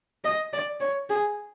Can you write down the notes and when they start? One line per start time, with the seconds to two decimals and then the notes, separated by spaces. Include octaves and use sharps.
0.24 D#5
0.53 D5
0.81 C#5
1.10 G#4